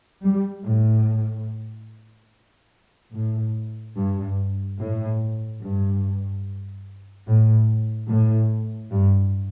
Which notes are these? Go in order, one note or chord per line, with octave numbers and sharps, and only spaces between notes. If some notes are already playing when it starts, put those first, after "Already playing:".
G3
A2
A2
G2
A2
G2
A2
A2
G2